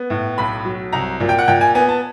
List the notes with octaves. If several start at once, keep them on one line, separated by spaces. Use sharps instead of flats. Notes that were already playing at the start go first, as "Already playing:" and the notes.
Already playing: B3
A2
B1 B5
F#3
C2 A#5
A#2
G5
F#5
A#2 G5
G#5
B3 G#5
A5